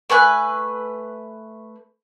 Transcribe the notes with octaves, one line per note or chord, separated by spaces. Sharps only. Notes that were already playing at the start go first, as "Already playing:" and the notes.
A3 B4 G#5 F#6